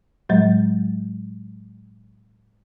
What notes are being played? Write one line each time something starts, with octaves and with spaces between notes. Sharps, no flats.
A2 F#3 G#3